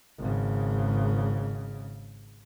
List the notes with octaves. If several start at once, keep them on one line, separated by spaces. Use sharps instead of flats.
G#1 C#3